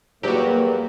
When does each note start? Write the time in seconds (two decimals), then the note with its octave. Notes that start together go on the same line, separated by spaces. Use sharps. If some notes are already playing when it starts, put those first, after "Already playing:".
0.23 E2 F#3 G3 A#3 F#4 G4